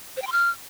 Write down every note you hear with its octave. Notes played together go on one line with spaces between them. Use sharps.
C5
G5
C6
F6